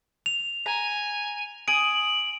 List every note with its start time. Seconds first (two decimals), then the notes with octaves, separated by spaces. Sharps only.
0.26 F7
0.66 G#5 A#5
1.68 G#5 D#6 D7 F#7